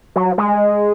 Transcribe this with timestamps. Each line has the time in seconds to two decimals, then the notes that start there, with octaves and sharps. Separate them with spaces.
0.16 F#3
0.38 G#3